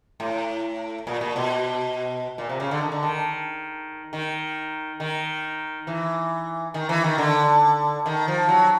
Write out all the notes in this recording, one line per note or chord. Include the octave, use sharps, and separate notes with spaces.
A2
A#2
A#2
B2
A#2
C3
C#3
D3
D#3
D3
D#3
D#3
D#3
E3
D#3
E3
D#3
D3
D#3
F3
F#3